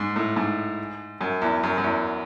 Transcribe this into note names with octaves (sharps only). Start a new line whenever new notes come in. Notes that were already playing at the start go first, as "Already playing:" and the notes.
Already playing: G#2
A2
G#2
F#2
E2
F#2
F#2
E2